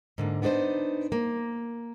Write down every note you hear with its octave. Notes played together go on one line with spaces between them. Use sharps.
G#2 D3 A#3
B3 D4 D#4 B4 C5
A#3